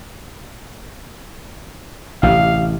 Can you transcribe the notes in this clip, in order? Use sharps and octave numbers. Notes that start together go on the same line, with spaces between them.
A1 C3 F5